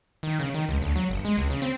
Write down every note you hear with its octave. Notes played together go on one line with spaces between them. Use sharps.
D#3
C#3
D#3
C#2
D2
F#3
G1
G#3
C#2
C#3
C4